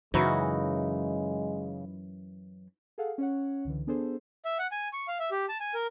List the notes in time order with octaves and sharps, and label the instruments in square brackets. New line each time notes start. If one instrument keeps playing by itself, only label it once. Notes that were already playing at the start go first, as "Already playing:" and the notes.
[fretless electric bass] F#2 E3 [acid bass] C#3 [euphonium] G#3 [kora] D#4 E4 F#4
[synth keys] G#4 A4 F5 F#5
C#4 C#5 F#5
C#2 D3 E3
B3 D4 G#4 A4 C5
[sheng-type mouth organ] E5
F#5
G#5
C#6
F5
E5
G4
A5
G#5
A#4